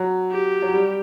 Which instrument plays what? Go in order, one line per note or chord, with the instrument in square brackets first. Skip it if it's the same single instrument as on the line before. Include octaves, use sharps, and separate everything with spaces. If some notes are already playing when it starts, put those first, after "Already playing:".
Already playing: [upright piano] F#3
[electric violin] G4
[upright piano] F#3
G3